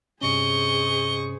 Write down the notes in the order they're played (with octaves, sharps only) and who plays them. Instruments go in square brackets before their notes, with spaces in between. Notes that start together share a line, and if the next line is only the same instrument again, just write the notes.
[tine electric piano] G2 C3 C#4 [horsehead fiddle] G#4 C5 [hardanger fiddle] D#5 C#6 [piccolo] G7